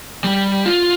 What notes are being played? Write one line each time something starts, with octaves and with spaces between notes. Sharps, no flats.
G3
F4